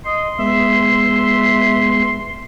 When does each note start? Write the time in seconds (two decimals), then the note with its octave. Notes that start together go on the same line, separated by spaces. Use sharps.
0.06 D#5 C6
0.39 G#3 B3 E5